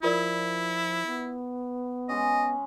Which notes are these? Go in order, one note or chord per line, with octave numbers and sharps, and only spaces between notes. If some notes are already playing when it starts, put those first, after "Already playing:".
F3 E4 F4 A#4 D5
B3
G#3 C#4 D#5